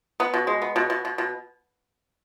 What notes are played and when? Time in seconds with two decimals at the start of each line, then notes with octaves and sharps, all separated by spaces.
0.20 B3 B4
0.34 B2
0.47 G#3
0.62 B3
0.76 B2
0.90 B2
1.05 B2
1.18 B2